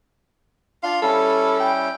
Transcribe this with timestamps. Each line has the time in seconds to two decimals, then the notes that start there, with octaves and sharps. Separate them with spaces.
0.83 D4 F4 F5 C6
1.02 G3 C#4 E4 A4
1.60 G5